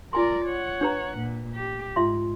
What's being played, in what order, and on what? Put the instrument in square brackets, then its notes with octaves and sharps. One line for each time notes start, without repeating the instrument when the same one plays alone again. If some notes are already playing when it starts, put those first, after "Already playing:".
[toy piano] F4 G#5 C6 [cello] A#4 D5
[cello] C#5 F#5
[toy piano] D4 B4 A#5
[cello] A#2
G4
[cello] G#2 [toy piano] F4 E5 C6